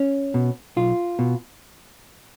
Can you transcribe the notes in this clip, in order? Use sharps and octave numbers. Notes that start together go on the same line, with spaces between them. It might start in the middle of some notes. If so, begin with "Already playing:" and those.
Already playing: C#4
B2
B1 F4
B2